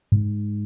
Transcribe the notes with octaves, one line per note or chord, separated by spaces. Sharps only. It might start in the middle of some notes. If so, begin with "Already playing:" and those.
G#2